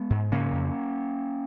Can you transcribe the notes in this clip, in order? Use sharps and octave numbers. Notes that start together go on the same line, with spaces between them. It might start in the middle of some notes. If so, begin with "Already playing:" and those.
Already playing: G#3 B3
G#2
C#3 A#3 C#4
F2